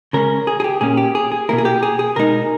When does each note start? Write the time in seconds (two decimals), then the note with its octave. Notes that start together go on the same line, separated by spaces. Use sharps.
0.13 C#3 G#3 C#4 A#4
0.47 G#4
0.60 G#4
0.64 G4
0.81 A#2 A#3 C#4 G#4
0.97 G4
1.15 G#4
1.32 G#4
1.49 B2 A#3 E4 A#4
1.58 G#4
1.65 G4
1.83 G#4
1.99 G#4
2.16 B2 G#3 D#4 A#4